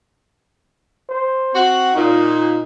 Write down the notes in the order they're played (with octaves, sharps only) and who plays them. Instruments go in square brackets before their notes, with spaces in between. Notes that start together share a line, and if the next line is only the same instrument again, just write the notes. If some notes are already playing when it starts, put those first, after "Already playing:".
[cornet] C5
[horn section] C4 F#4
[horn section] A#2 [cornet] D#4